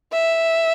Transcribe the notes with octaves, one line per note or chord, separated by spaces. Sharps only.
E5